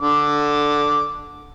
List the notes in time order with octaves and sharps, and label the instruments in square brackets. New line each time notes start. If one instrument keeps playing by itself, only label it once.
[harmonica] D3 D6